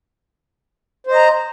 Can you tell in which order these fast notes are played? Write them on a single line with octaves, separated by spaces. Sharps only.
C5 D#5 A#5